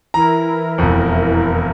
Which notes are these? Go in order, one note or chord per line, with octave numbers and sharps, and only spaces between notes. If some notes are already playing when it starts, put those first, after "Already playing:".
E3 E4 A#4 A#5
E1 F2